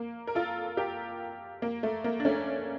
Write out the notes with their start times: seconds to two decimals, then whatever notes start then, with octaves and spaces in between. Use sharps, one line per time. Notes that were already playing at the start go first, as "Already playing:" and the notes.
Already playing: A#3
0.27 A#4
0.35 F4 A4
0.77 G4 A#4
1.62 A#3
1.83 A3
2.04 A#3
2.20 D4
2.25 A3 C#4